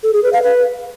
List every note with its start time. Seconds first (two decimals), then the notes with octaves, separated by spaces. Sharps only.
0.03 A4
0.13 G#4
0.23 B4
0.33 F5
0.43 B4